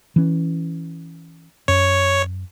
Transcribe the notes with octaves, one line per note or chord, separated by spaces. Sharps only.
E3 C#4
F#2 C#5